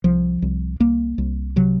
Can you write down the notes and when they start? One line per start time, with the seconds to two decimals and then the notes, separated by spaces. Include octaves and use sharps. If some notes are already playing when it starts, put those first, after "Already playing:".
0.04 C2 F3
0.42 C2
0.80 C2 A#3
1.18 C2
1.56 C3 F#3